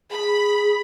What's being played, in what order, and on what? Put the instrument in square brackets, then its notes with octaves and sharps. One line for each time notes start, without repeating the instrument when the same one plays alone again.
[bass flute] G#4 [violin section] B5